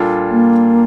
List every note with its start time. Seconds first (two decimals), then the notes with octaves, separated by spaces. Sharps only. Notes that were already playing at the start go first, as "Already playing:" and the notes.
Already playing: A#2 G3 D4 F4 A4
0.31 A#3